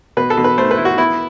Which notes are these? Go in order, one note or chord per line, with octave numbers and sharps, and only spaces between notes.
B2 B4
A4
B2
B4
A3 C5
B4
E4
F#4
B3 E4